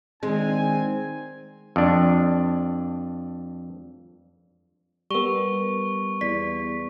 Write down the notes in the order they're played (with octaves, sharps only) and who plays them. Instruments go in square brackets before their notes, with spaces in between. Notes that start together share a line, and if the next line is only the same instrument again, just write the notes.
[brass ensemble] D#3 D4 D#4 [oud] G#3 [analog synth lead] C4 [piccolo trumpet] G#5
[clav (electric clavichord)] F2 D4
[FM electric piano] G3 B3 [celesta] A#4 G7 [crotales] C#6
[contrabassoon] E2 [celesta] D5 B6